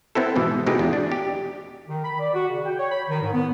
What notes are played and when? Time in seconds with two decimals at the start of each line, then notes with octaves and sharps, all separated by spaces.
0.15 B3 C4 E4 A4
0.36 G#2 B2 E3
0.66 B2 G#3 D#4 G4 G#4
0.79 E2
0.93 D4
1.12 G4
1.89 D#3
2.03 B5
2.19 D5
2.34 F#4
2.48 C#3
2.66 G5
2.79 C#5
2.91 B5
3.09 D#3
3.22 G#2
3.34 B3